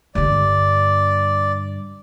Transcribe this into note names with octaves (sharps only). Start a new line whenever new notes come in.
G2 D3 D5